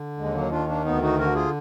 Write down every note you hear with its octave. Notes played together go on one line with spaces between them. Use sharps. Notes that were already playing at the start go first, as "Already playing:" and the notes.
Already playing: D3
D#2 G#3
F#3 A#3
D#3 D4 F4
A#3 D4
D2 B3 D#4
D#4 F#4
D3 F#4 A#4
F4 G#4